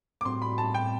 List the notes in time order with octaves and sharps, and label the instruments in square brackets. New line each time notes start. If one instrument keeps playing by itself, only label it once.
[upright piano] D6
[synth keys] A2 G3 C4 F#4 [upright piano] C6
[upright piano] B5
A5
G5